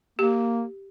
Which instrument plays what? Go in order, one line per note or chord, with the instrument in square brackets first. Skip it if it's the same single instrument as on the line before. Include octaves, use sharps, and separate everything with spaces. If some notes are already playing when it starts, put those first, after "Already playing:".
[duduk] A#3 [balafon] G4